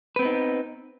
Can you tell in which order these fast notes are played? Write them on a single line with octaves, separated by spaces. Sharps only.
B4 C4 B3 D#4